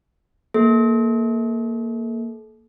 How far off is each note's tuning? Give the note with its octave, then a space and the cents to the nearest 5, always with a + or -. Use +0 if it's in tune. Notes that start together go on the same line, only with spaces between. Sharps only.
A#3 -5 A4 -35